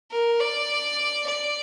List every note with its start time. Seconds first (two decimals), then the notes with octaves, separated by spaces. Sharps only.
0.11 A#4
0.40 D5
1.27 D5